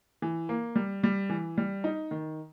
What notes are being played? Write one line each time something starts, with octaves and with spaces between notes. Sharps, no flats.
E3
A#3
G3
G3
E3
G3
D#4
D#3